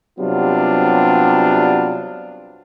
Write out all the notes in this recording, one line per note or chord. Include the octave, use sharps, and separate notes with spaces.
C3 F#3 G3 B3 D4 F4